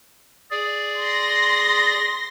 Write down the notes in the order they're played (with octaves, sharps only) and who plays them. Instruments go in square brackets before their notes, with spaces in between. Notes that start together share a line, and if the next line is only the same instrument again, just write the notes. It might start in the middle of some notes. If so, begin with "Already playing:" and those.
[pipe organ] G#4 D5
[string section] C6 A#6